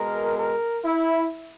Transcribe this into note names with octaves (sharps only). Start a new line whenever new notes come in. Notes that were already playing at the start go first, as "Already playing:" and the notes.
Already playing: B2 G#3 A#4
A#4
E4